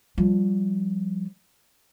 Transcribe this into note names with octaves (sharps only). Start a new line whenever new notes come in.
F3 G3